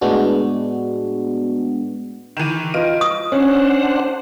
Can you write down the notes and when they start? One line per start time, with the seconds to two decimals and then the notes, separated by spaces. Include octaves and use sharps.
0.01 A2 G#3 B3 D4 F#4
2.37 D#3 E3 D#7 E7
2.74 F4 B4 D#5 F6 D7 D#7
3.01 D#6
3.32 C#4 D4 C5 F#5